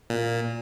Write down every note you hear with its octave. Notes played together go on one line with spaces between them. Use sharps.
A#2